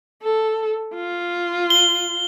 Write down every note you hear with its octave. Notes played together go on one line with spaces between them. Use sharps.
A4
F4
G7